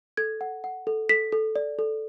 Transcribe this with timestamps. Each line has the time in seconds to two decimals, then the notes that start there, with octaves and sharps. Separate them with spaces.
0.17 A4 G#6
0.41 F#5
0.64 F#5
0.87 A4
1.09 A4 B6
1.32 A4
1.56 D5
1.79 A4